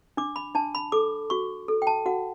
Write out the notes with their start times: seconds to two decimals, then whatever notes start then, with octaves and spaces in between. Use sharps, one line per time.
0.17 D4 D6
0.36 B5
0.55 D4 A5
0.75 B5
0.92 A4 D6
1.30 F#4 C#6
1.68 A4
1.82 G5
1.87 A5
2.06 F#4 F#5